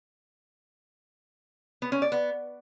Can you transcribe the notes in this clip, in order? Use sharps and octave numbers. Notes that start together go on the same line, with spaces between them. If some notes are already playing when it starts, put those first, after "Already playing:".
B3
C#4
D5
B3